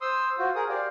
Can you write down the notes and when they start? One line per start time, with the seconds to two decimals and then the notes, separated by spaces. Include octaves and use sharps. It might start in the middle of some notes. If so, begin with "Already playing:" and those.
0.01 C5 C6 D#6 E6
0.38 F4 F#4 C5
0.55 G#4 A#4 D#6
0.69 G4 C5 D5 F5